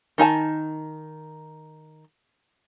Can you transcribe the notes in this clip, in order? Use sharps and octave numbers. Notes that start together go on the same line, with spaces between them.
D#3 D#4 G#5 A5